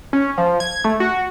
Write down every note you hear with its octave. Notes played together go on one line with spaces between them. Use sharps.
C#4
F3
G#6
A3
F#4